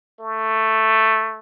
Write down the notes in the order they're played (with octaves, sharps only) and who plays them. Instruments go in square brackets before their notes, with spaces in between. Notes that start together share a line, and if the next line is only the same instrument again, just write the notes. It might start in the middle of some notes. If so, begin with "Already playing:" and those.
[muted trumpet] A3